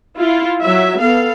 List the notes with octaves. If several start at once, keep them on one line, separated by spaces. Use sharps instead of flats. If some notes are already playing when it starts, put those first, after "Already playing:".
E4 F4
F#3 E5
B3 A4 F5